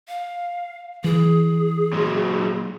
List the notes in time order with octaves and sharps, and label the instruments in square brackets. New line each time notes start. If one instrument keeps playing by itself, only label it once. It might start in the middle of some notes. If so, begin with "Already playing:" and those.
[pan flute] F5
[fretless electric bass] E3 [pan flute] G#4
[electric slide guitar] A#2 F#3 G#3